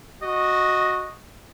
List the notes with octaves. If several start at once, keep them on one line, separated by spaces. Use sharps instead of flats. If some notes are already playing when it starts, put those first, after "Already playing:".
F#4 D#5